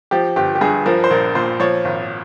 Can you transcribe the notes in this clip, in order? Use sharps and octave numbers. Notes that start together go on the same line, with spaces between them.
F3 G4
G1 G4
G4
G2 G#4
F3 A#4
C5
A#1 A#4
A#2 C5
F3 C#5
G#1